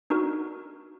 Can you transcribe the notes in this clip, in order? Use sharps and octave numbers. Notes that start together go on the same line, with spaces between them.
D4 D#4 F#4 A#4